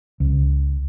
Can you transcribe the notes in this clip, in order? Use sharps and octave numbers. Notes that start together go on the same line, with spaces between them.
C#2